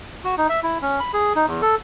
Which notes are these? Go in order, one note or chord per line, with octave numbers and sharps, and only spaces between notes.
F#4
D#4
E5
E4
C#4
B5
G#4
D#4
E2
A4